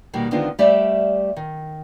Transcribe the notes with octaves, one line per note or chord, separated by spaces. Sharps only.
B2 D#3 G3 A#3
D3 D#3 G#3 B3 C4 F4
G3 A3 G4 C5 D5 E5
D#3